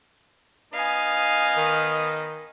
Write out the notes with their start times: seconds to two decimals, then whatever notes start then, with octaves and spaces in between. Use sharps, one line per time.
0.73 B3 D#4 F5 G#5
1.57 D#3